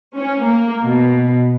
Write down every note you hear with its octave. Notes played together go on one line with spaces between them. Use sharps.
C#4
A#3
B2